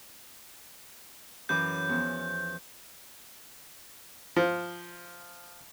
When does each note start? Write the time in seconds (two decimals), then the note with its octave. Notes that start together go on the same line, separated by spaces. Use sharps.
1.49 F#2 E3 D6 G6
1.89 E2 F3
4.36 F3